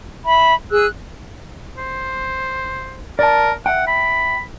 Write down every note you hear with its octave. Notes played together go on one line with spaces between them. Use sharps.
E5 B5
G#4 E6 F#6
C5
A#4 D5 A5
E5 F#5 G5
B5